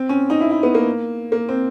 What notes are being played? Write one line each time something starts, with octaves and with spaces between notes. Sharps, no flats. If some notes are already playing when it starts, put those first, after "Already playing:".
Already playing: C4
C#4
D#4
E4
E4
B3
A#3
A#3
C4